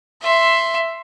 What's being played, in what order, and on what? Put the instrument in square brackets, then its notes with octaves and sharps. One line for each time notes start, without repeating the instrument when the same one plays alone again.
[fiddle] E5 C6